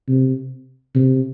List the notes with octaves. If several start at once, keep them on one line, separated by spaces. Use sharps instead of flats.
C3
C3